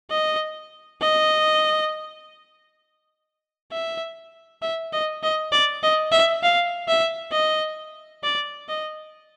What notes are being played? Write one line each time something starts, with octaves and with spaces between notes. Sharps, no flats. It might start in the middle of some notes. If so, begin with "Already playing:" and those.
D#5
D#5
E5
E5
D#5
D#5
D5
D#5
E5
F5
E5
D#5
D5
D#5